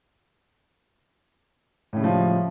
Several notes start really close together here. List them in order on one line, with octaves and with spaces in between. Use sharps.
A2 C#3 G3 F3